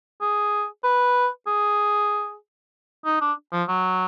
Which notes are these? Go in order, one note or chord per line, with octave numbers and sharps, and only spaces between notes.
G#4
B4
G#4
D#4
D4
F3
F#3